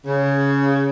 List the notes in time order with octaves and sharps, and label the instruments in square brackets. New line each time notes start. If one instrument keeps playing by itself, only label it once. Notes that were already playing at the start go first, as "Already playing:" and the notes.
[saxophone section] C#3